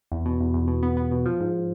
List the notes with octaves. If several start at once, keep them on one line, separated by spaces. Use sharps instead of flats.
E2
B2
E2
E2
B2
B3
B3
B2
F3
G#2